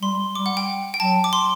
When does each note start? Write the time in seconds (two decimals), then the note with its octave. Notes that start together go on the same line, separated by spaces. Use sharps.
0.02 G3 C6
0.35 G3 D6
0.46 F#5
0.57 G5
0.94 G5
0.99 F#3 A5
1.24 D6
1.33 C6